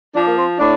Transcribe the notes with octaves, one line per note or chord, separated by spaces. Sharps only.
F3 D4
A#3
C4
A2 D4